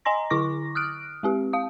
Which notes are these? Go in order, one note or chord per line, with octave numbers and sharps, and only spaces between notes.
D#5 G#5 A#5 C6 A#6
D3 E4 C#6 D6 A#6
D#6 F6 F#6 D7
G#3 C4 G4
F5 D#6